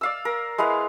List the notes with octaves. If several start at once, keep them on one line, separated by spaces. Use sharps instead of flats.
D5 F5 E6
A#4
G#3 E4 B4 F5